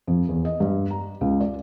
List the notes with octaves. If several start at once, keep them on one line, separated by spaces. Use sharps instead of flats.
F2
E2
D#5
G2
A#5
C#2
D5